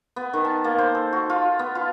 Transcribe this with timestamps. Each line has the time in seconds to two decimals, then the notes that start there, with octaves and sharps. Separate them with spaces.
0.16 B3
0.33 D#3
0.45 A5
0.64 A#3
0.78 C5
0.95 A4
1.13 F#4
1.30 F4
1.59 B3
1.75 F4